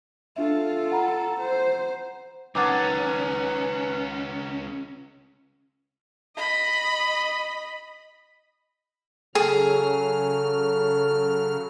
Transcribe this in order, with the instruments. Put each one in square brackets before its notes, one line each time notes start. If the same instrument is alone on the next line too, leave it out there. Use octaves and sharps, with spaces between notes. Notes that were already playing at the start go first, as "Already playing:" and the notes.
[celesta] D4 E5 [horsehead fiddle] F4 A4
[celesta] F#5 A#5 B5
[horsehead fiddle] C5
[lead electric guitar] C#2 C#4 [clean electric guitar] D#3 F#3 A4 [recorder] B4 [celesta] F#5 D6
[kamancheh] D#5 B5
[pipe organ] C#3 F#3 F6 [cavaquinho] G#4 [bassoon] A4